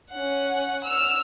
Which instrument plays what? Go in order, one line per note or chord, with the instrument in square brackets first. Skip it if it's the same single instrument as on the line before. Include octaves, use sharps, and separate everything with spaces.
[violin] C#4 F#5
E6 F6